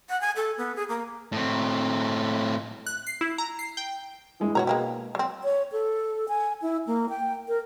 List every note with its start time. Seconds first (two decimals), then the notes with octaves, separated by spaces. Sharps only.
0.09 F#5
0.21 G#5
0.36 A4
0.58 B3
0.76 G#4
0.89 A#3
1.32 A2 C4
2.86 F#6
3.07 C7
3.21 E4
3.38 A#5
3.59 C7
3.77 G5
4.40 E3 G#3 E4
4.55 B2 F#4 C#5 A#5
4.67 G#3 A#3 G4
5.15 F#3 C4
5.44 C#5
5.72 A4
6.29 G#5
6.62 E4
6.87 A#3
7.09 G5
7.48 A#4